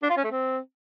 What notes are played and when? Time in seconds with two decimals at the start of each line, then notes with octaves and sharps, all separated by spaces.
0.03 D4
0.10 F4
0.17 C#4
0.24 A3
0.31 C4